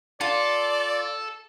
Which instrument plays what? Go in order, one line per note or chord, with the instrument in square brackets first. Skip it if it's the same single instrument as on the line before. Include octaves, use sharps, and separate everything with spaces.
[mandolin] F4 [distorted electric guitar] A4 [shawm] D5